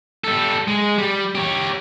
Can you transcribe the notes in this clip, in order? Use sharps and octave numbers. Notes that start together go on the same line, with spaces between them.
G3 A4
G#3
G3
G4 C#5